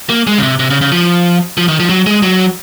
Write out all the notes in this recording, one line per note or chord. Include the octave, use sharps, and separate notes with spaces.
A#3
G#3
C#3
C3
C3
C#3
C#3
F3
F3
D#3
F3
F#3
G#3
F#3